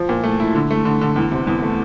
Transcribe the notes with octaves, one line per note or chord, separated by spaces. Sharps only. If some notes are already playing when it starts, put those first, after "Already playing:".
Already playing: F3
A#2
A3
E4
D3
A3
D3
D3
E2
C3
E2
A3